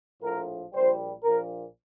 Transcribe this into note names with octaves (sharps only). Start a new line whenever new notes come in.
A#1 A2 F3 A#4
A#1 A#2 G3 C5
A#1 A#2 F3 A#4